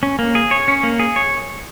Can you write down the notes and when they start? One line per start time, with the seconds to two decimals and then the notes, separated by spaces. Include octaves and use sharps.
0.03 C#4
0.19 A#3
0.35 G#4
0.51 C#5
0.68 C#4
0.83 A#3
0.99 G#4
1.16 C#5